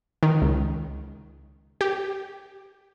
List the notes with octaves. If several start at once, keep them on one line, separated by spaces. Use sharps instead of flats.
D#3
C#2
G4